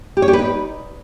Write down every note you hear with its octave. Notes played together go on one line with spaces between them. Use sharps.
G4
C#5
G4
B4
D#4